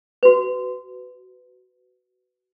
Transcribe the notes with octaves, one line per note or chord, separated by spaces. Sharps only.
F#4 B4